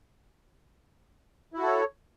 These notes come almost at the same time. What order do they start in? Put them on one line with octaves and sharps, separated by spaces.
E4 F#4 A4 C#5